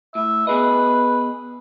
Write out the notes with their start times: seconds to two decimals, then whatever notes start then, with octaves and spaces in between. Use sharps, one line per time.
0.15 A2 E5
0.47 B3 G#4 B4 D#5